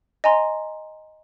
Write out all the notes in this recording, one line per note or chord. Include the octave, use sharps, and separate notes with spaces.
D#5 G#5 A#5 C6